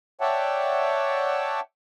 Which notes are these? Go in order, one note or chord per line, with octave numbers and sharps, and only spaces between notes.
C#5 D5 E5 F#5 G5 A5